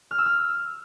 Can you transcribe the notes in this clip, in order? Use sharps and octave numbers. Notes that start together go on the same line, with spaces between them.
F6
E6
F6